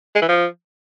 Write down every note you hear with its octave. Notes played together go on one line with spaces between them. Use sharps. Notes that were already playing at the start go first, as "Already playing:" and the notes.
G#3
E3
F3